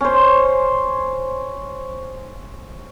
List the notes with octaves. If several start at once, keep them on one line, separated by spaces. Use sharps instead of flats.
C#4 C5